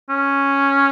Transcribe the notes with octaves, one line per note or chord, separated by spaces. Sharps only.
C#4